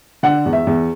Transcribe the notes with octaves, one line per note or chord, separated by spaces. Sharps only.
D3 F#5
E2
E5
E2